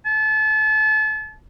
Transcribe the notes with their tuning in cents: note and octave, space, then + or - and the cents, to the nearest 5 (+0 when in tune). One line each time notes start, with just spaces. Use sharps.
A5 -35